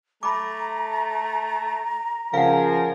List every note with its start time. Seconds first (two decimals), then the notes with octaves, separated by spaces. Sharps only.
0.23 A3 A#5 B5 D6
2.34 C#3 F3 A#4 F5 F#5 G#5